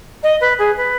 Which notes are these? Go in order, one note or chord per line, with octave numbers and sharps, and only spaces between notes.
D#5
B4
G#4
B4